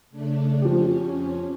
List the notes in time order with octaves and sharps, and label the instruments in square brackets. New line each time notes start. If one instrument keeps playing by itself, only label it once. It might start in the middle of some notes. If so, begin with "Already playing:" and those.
[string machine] C#3 A3 D4
[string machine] F2 C#4 [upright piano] F3 G4